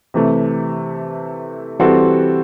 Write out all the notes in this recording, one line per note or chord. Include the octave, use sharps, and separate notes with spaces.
C3 E3 A3
E3 G3 C4 F#4 A4